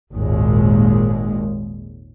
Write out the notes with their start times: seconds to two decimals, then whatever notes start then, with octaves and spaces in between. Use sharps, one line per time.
0.12 G#1 D#2 A#2 G#3